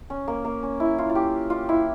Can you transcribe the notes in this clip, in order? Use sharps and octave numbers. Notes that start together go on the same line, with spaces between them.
C#4
A#3
A#3
C#4
E4
F4
F4
G4
F4
E4